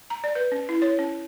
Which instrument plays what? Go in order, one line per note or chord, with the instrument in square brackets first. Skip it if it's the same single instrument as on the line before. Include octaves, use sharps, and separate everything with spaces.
[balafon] A#5
D5
B4
C#4
E4
C#5
C#4